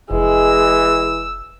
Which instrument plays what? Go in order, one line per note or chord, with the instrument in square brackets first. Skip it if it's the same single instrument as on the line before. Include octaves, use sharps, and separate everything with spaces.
[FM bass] F1 [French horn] E3 [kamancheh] G#3 [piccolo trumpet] E6